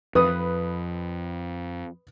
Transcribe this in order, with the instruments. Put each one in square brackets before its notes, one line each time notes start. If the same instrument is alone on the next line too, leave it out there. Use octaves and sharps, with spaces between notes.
[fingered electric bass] F2 [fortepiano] B4 D#6